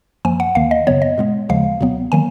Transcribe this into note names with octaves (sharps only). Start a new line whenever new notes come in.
F#2 F3 A#3 G#5
F#5
D#2 D#3 A#3 F5
D#5
F#2 C#3 F#3 B3 C#5
D#5
A#2 G#3 B3
D#2 C#3 F3 G#3 F5
C#2 B2 F#3 B3
D#3 F#3 A#3 G#5